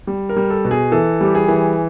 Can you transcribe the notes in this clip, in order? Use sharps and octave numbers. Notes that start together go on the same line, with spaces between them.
G3
A#4
G3
A4
B2
G#4
E3 A4
G3 G4
G#4
E3